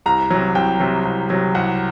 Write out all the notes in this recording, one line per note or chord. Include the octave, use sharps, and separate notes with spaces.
C2 A#5
C3 F#3
C2 G5
C3 F#3
C2
C3 F#3
C2 F#5